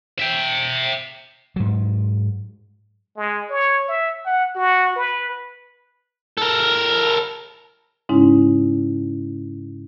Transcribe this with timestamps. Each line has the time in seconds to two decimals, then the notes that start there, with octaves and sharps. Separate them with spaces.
0.19 E5 G5
1.56 G#2 F#3
3.17 G#3
3.50 C#5
3.88 E5
4.26 F#5
4.55 F#4
4.96 B4
6.37 A4 A#4
8.09 G#2 C#3 G#3 C#4 D#4 E4